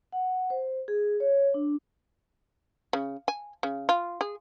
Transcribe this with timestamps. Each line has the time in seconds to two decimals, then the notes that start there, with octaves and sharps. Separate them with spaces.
0.12 F#5
0.50 C5
0.88 G#4
1.20 C#5
1.54 D4
2.93 C#3
3.28 G#5
3.63 C#3
3.89 F4
4.21 G#4